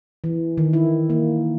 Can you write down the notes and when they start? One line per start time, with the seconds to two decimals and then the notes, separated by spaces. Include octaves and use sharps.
0.24 E3
0.57 D#3
0.73 E4
1.10 A#3